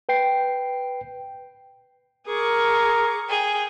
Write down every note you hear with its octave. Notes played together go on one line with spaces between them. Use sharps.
B4 G5 C7
G#4 A#4 C#6 D6
G#4 G5